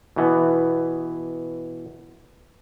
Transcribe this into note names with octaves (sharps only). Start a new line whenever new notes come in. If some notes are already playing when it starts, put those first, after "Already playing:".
B2 E3 B3